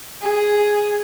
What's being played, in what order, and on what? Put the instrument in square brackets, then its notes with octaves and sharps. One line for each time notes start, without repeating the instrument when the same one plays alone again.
[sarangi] G#4